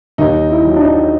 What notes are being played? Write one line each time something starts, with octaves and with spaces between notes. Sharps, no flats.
D#2 D#4
E4
D#3 F#3
D4
D#4